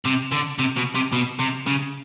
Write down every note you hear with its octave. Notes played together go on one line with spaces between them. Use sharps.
C3
D3
C3
B2
C3
B2
C3
C#3